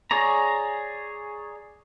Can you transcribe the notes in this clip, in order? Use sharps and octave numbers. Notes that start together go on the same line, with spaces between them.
G#4 C#5 D5 A#5